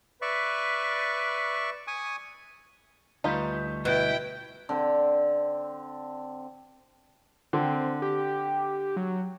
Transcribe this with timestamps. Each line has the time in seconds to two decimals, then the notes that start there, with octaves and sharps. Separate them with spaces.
0.22 B4 D5 E5 C#6
1.87 G#5 C#6 D#6
3.24 D2 G3 A3 D#4 F4 B4
3.85 B2 E4 G5
4.69 D3 C4
7.53 D3 C4
8.02 G4
8.97 F#3